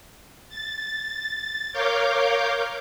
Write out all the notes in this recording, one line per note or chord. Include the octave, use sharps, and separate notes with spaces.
A6
A#4 C#5 F5 D6 G6